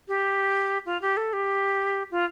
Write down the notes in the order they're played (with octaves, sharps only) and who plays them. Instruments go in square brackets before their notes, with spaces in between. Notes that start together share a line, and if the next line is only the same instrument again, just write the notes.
[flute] G4
F4
G4
A4
G4
F4